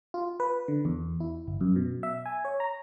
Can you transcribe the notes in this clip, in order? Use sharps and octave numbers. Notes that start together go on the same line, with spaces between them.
F4
B4
D3
E2
E4
G1
F#2
B2
E5
G#5
C#5
A#5